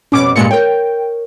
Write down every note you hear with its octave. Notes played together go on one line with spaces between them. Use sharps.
F2 B2 G3 C#4 D6
G2 A#2 G3 G#3 C#7
A#4 C#5 G5